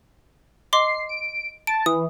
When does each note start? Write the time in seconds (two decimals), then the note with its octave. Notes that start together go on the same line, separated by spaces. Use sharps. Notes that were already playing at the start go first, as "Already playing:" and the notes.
0.73 D#5 C6 D6 C7
1.09 D7
1.67 A5 D7
1.86 E3 D#6